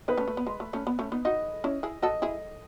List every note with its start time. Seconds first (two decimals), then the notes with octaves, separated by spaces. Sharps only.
0.08 B3 D#4 B4
0.17 A3 C#4
0.28 A3
0.37 B3
0.47 G#3
0.60 A3
0.73 A3 C#4
0.87 B3
0.99 A3 C#4
1.12 B3 D#4
1.25 D#4 F#4 D#5
1.64 C#4 E4
1.83 E4 G#4
2.02 F#4 A4 D#5
2.22 E4 G#4